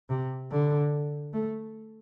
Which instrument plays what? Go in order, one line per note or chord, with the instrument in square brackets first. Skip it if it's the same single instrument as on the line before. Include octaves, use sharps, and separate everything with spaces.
[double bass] C3
D3
A3